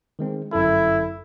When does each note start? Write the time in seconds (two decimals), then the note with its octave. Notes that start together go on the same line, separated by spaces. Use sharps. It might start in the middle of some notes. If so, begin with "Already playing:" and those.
0.19 D#3 G#3 C4
0.53 G1 F#2 E4 A4